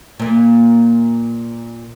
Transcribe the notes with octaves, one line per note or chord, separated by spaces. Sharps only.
A#2 A#3